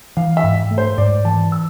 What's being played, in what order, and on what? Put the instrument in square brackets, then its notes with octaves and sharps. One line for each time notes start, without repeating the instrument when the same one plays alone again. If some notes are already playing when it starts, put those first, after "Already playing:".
[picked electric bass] E3 [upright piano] F5
[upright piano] E5
[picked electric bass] G#2
A3
[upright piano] C5
[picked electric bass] G#2 [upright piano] D5
[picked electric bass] E3 [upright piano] A5
[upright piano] E6